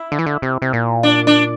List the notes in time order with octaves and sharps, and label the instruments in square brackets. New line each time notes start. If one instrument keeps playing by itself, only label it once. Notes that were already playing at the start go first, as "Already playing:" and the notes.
Already playing: [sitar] E4
[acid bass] D3
E3
D3
C3
C3
A#2
[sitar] D4
D4